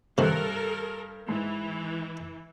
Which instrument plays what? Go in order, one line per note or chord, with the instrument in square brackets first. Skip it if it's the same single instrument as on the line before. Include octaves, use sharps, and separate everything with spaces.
[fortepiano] G2 F#6 [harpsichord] C3 D#3 [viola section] A4 A#4
[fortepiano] G#2 [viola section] E3